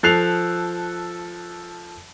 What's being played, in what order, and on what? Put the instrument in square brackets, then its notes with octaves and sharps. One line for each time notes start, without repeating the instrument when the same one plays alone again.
[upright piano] F3 A4 F#6 C7 F7